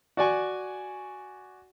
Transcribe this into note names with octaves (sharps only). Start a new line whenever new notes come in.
F#4 D5 G#5 C#6